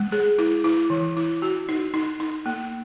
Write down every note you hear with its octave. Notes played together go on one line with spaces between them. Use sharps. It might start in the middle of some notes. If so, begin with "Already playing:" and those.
Already playing: G#3
G#4
E4
E4
E3
E4
F#4
D#4
D#4
D#4
A#3